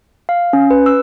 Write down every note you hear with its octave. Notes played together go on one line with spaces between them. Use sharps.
F5
C#4
B4
E6